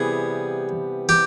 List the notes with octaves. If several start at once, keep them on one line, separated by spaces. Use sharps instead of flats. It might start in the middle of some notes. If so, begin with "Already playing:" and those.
Already playing: C3 E3 G3 B3 G#4
G4